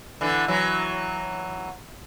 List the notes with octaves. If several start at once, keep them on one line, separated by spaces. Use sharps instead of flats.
D3 E3
E3 F#3